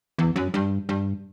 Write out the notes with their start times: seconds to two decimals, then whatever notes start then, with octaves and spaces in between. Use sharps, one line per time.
0.18 E2
0.36 F#2
0.54 G2
0.89 G2